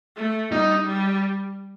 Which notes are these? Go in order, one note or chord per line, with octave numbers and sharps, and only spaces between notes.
A3
G3 D#4
G3